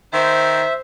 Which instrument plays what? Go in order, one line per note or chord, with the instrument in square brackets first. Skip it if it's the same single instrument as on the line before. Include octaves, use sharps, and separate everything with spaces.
[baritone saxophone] D#3 [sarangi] C5 [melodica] E5